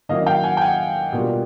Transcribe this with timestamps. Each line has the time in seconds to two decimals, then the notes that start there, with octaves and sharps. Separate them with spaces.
0.09 D#3 F#3 A#3 C#4 E4 D#5 F5
0.26 F5 G5
0.44 F#5 G#5
0.57 G5
0.61 F#5 G#5
1.12 B2 G3 A#3 D4 F4